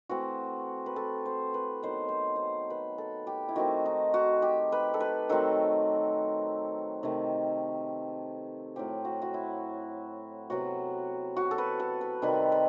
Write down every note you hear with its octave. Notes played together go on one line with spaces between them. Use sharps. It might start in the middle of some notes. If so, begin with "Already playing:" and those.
E3 A3 C4 F#4
B4
A4
C5
B4
D#3 F#3 B3 C5
C5
C5
B4
A4
G4
E4
D#3 A3 C4 F#4
D#4
F#4
G4
B4
A4
B4
D#3 F#3 A3 C4 A4
C3 D#3 A3
A2 F#3 A3 C4 G4
F#4
F#4
E4
C3 F#3 B3 F#4
F#4
A4
B4
A4
B4
C3 D#3 G3 B4
B4